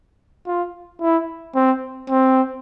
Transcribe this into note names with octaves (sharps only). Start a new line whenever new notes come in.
F4
E4
C4
C4